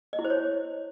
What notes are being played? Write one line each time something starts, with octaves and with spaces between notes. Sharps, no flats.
D#5
E4
C5
C#5